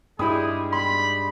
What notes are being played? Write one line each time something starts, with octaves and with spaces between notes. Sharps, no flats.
G2 G3 G#3 D#4 E4 G#4 B5 D#6
B5 C6